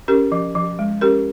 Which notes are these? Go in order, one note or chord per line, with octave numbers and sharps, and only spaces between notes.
C#4 G4 A#4
F3
F3
G#3
C#4 G4 A#4